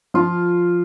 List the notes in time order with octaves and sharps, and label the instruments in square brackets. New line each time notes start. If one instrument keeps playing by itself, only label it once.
[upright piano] F3 [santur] F4